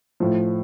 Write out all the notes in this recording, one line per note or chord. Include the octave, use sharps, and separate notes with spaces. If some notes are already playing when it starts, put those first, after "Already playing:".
A2 F3